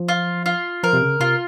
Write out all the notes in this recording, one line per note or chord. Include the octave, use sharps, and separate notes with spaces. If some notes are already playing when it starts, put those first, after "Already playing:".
Already playing: F3
F4
F4
F3 A#4
C3
C#3
C3 F4